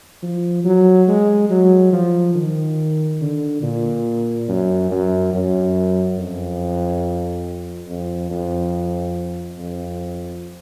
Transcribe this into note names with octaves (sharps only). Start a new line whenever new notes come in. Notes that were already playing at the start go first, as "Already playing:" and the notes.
F3
F#3
G#3
F#3
F3
D#3
D3
A#2
F#2
F#2
F#2
F2
F2
F2
F2